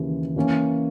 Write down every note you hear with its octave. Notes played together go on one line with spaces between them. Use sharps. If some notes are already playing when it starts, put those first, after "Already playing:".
Already playing: D#2 C#3 E3
E3 A#3 C#4